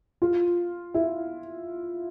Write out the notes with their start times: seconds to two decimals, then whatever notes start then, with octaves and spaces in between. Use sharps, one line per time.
0.22 F4
0.94 E4